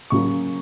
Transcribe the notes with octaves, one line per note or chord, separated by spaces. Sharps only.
C#3 F#3 A#3 C#6